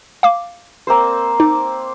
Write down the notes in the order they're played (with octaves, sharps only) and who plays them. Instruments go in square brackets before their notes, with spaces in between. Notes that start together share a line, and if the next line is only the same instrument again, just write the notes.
[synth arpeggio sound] F5 D6
[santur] A#3 C4 C5
[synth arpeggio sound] D#4 [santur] D6